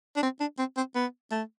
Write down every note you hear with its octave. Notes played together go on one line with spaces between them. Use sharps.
D4
C4
D4
C4
C4
B3
A3